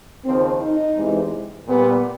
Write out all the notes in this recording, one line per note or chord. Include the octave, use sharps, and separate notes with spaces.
D#2 C#3 F3 C4
D#4
E2 C3 E3 G#3
A#2 G3 B3